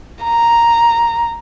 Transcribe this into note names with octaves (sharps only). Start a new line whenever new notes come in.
A#5